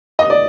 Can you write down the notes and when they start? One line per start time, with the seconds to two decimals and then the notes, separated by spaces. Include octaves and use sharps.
0.19 D#5
0.30 D5